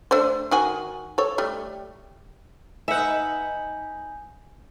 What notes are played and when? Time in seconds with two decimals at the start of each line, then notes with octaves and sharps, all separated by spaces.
0.11 A3 D4 C5
0.51 D#3 F#4 G#5
1.18 A4 C#5
1.38 G3 A3
2.88 D#4 B4 E5 F#5 G#5 G6